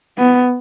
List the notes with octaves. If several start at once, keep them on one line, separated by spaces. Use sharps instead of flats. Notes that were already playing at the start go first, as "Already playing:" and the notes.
B3